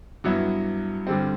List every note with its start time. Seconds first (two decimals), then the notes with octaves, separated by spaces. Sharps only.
0.24 G2 F#3 B3 E4
1.07 G2 D3 G3 C4